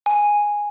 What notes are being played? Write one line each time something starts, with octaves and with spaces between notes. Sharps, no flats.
G#5